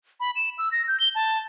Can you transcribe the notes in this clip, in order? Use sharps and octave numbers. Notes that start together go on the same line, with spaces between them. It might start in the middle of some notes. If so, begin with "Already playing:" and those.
B5
E7
E6
A#6
G6
G7
A5